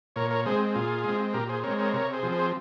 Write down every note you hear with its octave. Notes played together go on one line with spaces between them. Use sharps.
A#2 A#4 C#5
A#4 C#5
G#3 C4 G#4 C5
A#2 F4 G#4
G#3 C4
A#2 G4 A#4
G#4 C5
G#3 C4 A#4 C#5
A#4 C#5
C3 A#4 C#5
G#4 C5
F3 C4
G#4 C5